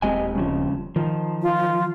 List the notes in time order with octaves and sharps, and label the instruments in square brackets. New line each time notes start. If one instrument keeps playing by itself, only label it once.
[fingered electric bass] D#1 G#3 C4 [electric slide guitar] G4 D#5 G#5
[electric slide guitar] G2 C#3 F3
[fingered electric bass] D#3 [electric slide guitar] F3
[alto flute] F4